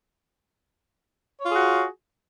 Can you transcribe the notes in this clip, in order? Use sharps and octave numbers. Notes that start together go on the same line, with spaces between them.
F4 F#4 G#4 C#5